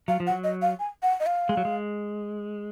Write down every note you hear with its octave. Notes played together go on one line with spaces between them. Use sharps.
F#3 F5
F3
F#5
F#3
D#5
F5
G#5
F#5
D#5
F5
G#3
F#3
G#3